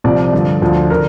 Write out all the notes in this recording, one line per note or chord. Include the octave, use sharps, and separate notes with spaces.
C2 C3 F3 D5
G2 D3 F3
D2 D3 F3
D3 A#4